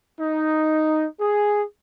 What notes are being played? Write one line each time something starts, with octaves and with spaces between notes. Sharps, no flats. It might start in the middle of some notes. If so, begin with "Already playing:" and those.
D#4
G#4